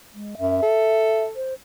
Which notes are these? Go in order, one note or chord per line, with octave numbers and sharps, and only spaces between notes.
G#3
F#2 E5
A4
C5